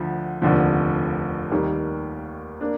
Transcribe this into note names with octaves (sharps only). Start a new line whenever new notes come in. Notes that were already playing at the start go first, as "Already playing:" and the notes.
Already playing: D2 D3 F3
F1 D#2 D3 F3
D#2 D#3 G3 A#3
A#3 D4